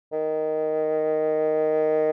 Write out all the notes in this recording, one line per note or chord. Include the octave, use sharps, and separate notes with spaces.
D#3